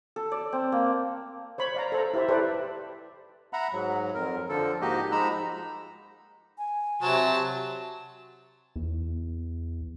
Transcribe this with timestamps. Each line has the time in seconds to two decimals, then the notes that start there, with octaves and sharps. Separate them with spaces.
0.16 A4
0.32 D5
0.53 C4
0.72 A#3
1.58 C5 C#5 B5
1.74 D5 F5 A#5
1.92 A4 C5 A#5
2.14 E4 G4 C5 E5
2.28 E4 G4 A4 B4 C5 D5
3.53 E5 F#5 A#5 B5
3.73 G#2 F#3
4.14 F2 A#4
4.49 D3 F3 A4
4.81 G#2 A#3 D#4 F#4 G4 D#5
5.12 F3 G#3 D#4 A#5 B5 E6
6.58 G#5
7.02 C3 F#3 C5 A5
8.76 E2